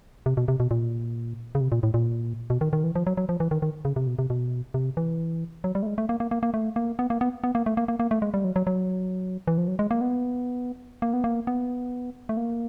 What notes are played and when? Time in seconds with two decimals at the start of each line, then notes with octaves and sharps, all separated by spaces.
0.26 C3
0.37 B2
0.48 C3
0.60 B2
0.71 A#2
1.55 C#3
1.61 C3
1.72 A#2
1.83 A2
1.94 A#2
2.50 B2
2.61 D#3
2.73 D#3
2.84 E3
2.95 F3
3.07 F#3
3.17 F#3
3.29 F3
3.40 E3
3.51 D#3
3.62 D#3
3.85 C#3
3.96 C3
4.07 B2
4.19 C3
4.30 B2
4.74 C3
4.97 E3
5.64 F#3
5.75 G3
5.83 A3
5.87 G#3
5.98 A3
6.09 A#3
6.20 A#3
6.31 A#3
6.43 A#3
6.54 A3
6.76 A#3
6.99 B3
7.10 A#3
7.21 B3
7.44 B3
7.55 A#3
7.66 A3
7.77 A#3
7.88 A#3
8.00 A#3
8.11 A3
8.22 G#3
8.34 G3
8.44 F#3
8.56 F#3
8.67 F#3
9.47 E3
9.58 F3
9.68 F#3
9.79 G#3
9.91 A#3
10.01 B3
11.02 A#3
11.14 B3
11.24 A#3
11.47 B3
12.29 A3
12.37 A#3